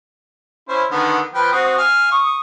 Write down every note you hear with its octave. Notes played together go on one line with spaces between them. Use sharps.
C#4 E4 C5
D3 D#3 B3
F3 B4 G5
C4 F#4 D#6
F5 G#5
C#6 D#6